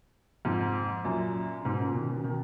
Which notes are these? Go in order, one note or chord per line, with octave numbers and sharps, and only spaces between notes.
F2 G#2
F#2 A#2
C#3
G#2 B2
A#2 C#3
B2 D#3
B2 D#3
C#3
B2 D#3